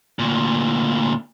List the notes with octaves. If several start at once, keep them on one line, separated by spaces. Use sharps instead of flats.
D2 A#2